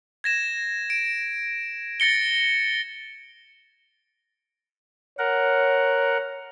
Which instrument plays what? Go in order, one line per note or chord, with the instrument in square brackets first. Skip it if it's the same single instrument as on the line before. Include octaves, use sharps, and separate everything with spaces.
[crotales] G#6 A#6 E7
D7
A6 A#6 C#7 G7
[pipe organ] A#4 F#5 [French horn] C#5